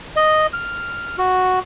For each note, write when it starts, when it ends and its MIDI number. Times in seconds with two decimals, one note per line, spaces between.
0.16 0.47 75
0.53 1.16 89
1.18 1.59 66